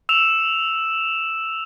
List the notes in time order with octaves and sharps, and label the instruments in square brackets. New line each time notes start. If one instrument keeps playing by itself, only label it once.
[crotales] E6 E7 F7